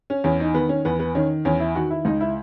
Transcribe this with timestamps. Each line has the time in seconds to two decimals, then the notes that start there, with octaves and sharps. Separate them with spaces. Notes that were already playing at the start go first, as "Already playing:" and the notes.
0.10 C#4
0.24 E2 C#4
0.40 D#4
0.54 D#3 B3
0.69 C#4
0.85 E2 B3
0.99 B3
1.15 D#3 C#4
1.45 E2 C#4
1.60 E4
1.75 D#3 F#4
1.91 E4
2.05 C#2 D#4
2.21 E4